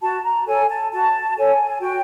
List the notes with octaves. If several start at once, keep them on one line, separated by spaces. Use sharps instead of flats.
F#4 A5
A#5
A4 C#5 G#5
A5
F#4 A5
A4 C#5 G#5
F#4 G5